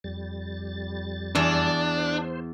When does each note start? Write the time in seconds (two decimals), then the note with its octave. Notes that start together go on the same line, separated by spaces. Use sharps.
0.04 F2 G3 A6
1.35 E2 D4
1.97 C5